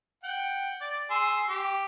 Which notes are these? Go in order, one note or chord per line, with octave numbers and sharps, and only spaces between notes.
F#5 G5
D5
G#4 C6 E6
G4